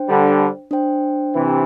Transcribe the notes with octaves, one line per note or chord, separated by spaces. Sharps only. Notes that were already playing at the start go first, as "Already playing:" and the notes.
Already playing: D4 C5 G5
D3 G3
D4 C5 G5
C3 E3